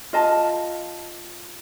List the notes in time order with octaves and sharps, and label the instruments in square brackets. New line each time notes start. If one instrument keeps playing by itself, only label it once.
[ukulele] F4 D#5 A5